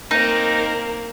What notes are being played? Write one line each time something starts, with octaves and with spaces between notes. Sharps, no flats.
A#3 C4 D#4 A#4